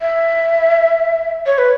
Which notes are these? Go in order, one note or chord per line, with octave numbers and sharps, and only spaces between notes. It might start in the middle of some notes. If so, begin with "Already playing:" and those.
E5
C#5
B4